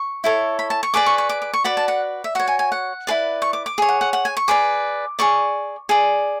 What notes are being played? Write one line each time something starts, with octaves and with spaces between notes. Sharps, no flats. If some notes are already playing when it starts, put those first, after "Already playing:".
Already playing: C#6
E4 A4 C#5
B5
A5
C#6
G#4 B4 D5 D6
C#6
C#6
D6
D6
C#6
F#4 B4 D5 B5
A5
F#5
E5
F#4 C#5 F#5
G#5
G#5
F#5
E4 G#4 B4 D5
C#6
D6
D6
G#4 C#5
F#5
F#5
F#5
G#5
C#6
G#4 B4 D5 D6
G#4 D5 C#6
G#4 D5